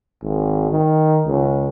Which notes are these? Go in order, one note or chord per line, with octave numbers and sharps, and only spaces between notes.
G#1
D#3
C#2